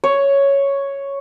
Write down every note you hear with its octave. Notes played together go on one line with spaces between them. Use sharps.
C#5